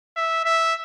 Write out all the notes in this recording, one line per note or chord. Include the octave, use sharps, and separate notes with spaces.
E5
E5